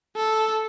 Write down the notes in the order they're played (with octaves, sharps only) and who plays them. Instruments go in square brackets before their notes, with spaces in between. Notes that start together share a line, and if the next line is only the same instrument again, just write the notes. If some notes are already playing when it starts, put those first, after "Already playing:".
[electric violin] A4